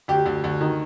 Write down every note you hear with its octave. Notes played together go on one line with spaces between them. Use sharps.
D2 G4
D2
D2
D#3